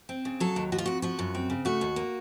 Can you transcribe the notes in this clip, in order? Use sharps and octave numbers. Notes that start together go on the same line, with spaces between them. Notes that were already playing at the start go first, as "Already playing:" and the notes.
C4
C#3
F#3 A4
D#2
F3 F#4
F4
F2 F#4
F3 F#4
F#2
C4
C#3
A3 F#4
D#2
A#3